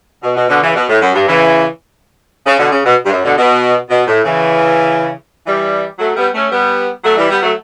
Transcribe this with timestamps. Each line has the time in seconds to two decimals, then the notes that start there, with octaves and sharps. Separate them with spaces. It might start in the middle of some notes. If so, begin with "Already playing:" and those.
0.23 B2
0.36 B2
0.49 B2 D3
0.62 C#3 E3
0.75 B2
0.89 A2
1.02 F#2
1.14 G2
1.28 C#3 E3
2.46 C#3
2.59 B2 D3
2.72 C#3
2.85 B2
3.06 G2
3.11 F#2
3.24 B2 D3
3.37 B2
3.90 B2
4.07 A2
4.25 C#3 E3
5.47 E3 G3
5.99 F#3 A3
6.17 G3 B3
6.34 A3 C#4
6.51 G3 B3
7.04 F#3 A3
7.17 E3 G3
7.30 G3 B3
7.43 F#3 A3